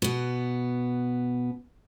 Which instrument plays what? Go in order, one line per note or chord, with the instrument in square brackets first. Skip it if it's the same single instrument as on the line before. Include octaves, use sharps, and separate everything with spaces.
[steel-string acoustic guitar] B2 B3